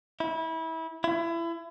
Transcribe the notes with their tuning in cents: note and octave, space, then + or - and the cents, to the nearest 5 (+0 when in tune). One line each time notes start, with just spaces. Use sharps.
E4 -25
E4 +30